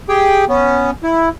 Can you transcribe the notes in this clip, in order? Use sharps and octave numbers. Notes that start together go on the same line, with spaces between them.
G4 G#4 G5
B3 C#4
E4